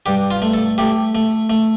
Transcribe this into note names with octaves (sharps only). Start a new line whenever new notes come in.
G2 G4
F4
A3
A4
A3 G4
A3
A3